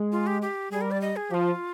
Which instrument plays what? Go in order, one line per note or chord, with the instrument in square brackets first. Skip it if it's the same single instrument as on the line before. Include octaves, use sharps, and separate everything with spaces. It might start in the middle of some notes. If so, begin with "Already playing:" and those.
Already playing: [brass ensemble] G#3
[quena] F4
G4
G4
[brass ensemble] G3 [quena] G#4
[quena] A#4
D5
D#5
G#4
[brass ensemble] F3 [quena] G4
[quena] F4